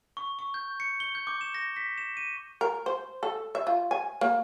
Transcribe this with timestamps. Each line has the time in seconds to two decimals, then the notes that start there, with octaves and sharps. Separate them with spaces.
0.17 C#6
0.39 C#6
0.54 G6
0.80 C#7
1.00 G7
1.15 G6
1.27 D6
1.41 E7
1.55 A#6
1.76 B6
1.98 E7
2.17 D#7
2.61 A#4
2.86 C5
3.23 A4
3.55 E5
3.67 F4
3.91 G#5
4.21 A#3